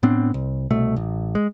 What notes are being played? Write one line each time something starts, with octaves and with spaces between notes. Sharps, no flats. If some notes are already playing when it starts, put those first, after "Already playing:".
A2 B3 C4 D4
C2
C2 B2 A3
A1
G#3